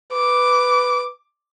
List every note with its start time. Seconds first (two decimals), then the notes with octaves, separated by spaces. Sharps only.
0.13 B4 D6